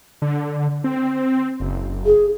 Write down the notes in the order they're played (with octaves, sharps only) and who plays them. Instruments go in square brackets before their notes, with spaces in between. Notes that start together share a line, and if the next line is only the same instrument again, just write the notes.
[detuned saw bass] D3
C4
F#1
[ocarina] G#4